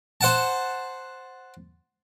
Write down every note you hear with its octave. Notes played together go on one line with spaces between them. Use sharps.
C5 F#5 A5